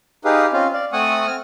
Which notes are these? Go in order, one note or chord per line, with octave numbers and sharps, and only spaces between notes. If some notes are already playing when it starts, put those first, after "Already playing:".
D#4 G4 G#4 B4 F5
C4 C#4 F4 F5
D5 F5
A3 C4 F#5 G#5 C#6 D#6
C4 F6